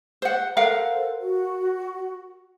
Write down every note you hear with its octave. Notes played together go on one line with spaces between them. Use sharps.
C5 F#5
A4 A#4 C5 F5 F#5
F#4